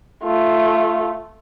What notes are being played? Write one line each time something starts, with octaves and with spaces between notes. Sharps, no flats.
A3 F4